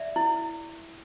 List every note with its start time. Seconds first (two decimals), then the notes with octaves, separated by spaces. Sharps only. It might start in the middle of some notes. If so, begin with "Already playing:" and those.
Already playing: D5 E5
0.16 E4